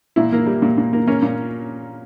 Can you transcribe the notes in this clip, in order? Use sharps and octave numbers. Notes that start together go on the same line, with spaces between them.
A#2 E4
A#3
G3
A#2
A#2
A#3
A#3 C#4
A#2